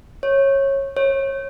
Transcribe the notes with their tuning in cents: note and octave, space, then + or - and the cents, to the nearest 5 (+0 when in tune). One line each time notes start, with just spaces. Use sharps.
C#5 -20
C#5 -30